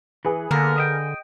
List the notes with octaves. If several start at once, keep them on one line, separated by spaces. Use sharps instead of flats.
E3 G#4 B4
D3 A#3 B3 A#4
D#5 E5 G5